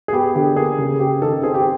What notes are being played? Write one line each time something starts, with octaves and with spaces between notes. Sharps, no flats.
G#4
B3 G4
D3 G4
A#3 G#4
C#3
C#4 G4
D#3 A4
C4 G#4
G4